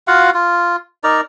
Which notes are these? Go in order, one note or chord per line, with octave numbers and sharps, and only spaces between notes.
F4 F#4 F5 F#5
F4
D#4 A#4 D5 A#5